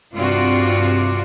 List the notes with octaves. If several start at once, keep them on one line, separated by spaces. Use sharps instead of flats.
G2 C3 F4 F#4 D5